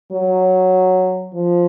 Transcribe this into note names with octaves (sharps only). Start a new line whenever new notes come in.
F#3
F3